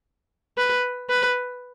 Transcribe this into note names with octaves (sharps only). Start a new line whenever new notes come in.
B4
B4